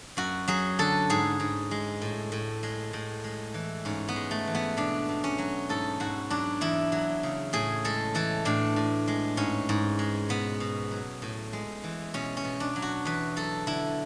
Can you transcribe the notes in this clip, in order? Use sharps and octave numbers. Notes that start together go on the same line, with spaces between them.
F#2 F#4
F#3 G#4
D3 A4
G#2 G#4
G#2
G#3
A2
A2
G#3
A2
G#3
E3
G#2 C#4
B3
G#3
A3
E3
B3
B2 D4
B2
C#4
F#3
G#2 A4
G#2 F#4
F#3 D4
E2 E4
F#3
C#3
A2 G#4
G#3 A4
E3 A4
A2 D4
A2
G#3
G#2 C#4
G#2
G#3
B2 B3
B2
F#3
A2
G#3
E3
B2 C#4
C#4
B2
D4
F#3
F#4
E2 B4
F#3 A4
D3 E4